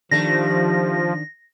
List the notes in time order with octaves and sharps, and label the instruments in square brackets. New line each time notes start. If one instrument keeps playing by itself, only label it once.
[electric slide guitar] D#3 D4 [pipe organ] F3 [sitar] G3 A3 [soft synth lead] A#6